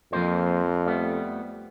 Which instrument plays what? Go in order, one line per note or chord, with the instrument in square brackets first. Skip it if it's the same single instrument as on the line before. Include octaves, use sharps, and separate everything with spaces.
[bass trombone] F2 [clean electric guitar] F3 A#3 C5
[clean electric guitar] G3 A3 B3